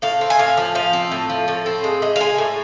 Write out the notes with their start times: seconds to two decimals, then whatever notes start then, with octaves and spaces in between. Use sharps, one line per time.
0.02 A2 F5
0.21 C4
0.30 G#5
0.39 A2 F5
0.57 F3
0.75 F3 F5
0.93 C4
1.11 A2
1.29 F3
1.48 A2
1.66 C4
1.84 G#3
2.02 G#3
2.16 F5
2.20 G#3 G#5
2.38 A2